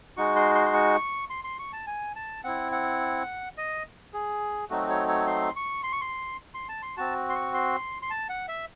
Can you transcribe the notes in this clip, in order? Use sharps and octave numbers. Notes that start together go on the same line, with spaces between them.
G#3 D#4 F#4 C#6
C6
C6
C6
C#6
C6
C6
C#6
A5
G#5
A5
C4 E4 F#5
F#5
D#5
G#4
F#3 A3 C4 D#4 F#4
C#5
C#5
C6
C#6
C6
C#6
C6
C6
A5
C6
C4 F#4 A5
C6
C#6
C6
C6
A5
F#5
E5